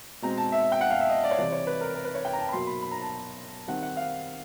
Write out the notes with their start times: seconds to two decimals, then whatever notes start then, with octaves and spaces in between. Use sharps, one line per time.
0.22 B2 G#3 C4 A#5
0.37 A5
0.52 E5
0.72 G5
0.81 F#5
0.90 F5
1.00 E5
1.09 D#5
1.24 D5
1.31 C#5
1.38 C3 E3 G3 D5
1.52 C#5
1.67 B4
1.81 A#4
1.95 A#4
2.05 B4
2.15 C#5
2.25 G5
2.33 A#5
2.39 A5
2.48 B5
2.53 B2 F#3 A#3 C6
2.67 B5
2.82 B5
2.91 A#5
3.02 A5
3.68 D#3 G3 C4 F#5
3.83 F#5
3.97 F5